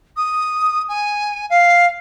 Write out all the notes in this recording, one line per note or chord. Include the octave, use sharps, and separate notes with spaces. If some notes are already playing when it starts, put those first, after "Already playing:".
D#6
G#5
F5